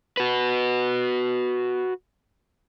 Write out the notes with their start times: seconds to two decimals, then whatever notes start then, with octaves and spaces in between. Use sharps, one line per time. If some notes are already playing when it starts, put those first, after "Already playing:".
0.17 F#4 B4